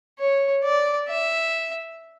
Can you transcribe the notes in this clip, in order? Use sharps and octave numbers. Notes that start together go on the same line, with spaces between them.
C#5
D5
E5